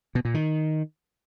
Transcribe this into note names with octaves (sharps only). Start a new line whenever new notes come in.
B2
A#2
D#3